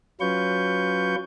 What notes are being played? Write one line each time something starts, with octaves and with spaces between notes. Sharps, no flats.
F#3 C#4 F4 B4 C#6 G6